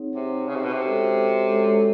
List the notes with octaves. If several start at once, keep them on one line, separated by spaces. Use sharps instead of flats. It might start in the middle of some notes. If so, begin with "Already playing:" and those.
Already playing: C4 D#4 G#4 C#5 F#5
C3 C4 D#4 G#4 C#5 F#5
C#3
C3
B2
C3
G#3 C#4 F#4 A4 C#5
G#3 C#4 F#4 A4 C#5